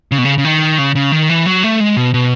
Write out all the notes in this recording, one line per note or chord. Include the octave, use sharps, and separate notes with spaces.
C#3
B2
C#3
C#3
D#3
C#3
C#3
D#3
E3
F#3
A3
G#3
B2
B2